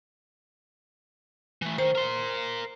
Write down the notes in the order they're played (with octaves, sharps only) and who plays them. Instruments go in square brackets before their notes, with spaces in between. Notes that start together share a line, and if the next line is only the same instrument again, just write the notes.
[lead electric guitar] E3 A3
[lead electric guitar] D#3 [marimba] C5
[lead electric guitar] A#4 C6